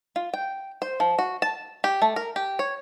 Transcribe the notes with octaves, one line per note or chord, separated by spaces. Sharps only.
F4
G5
C5
F3
F#4
A5
G4
A3
A#4
G4
C#5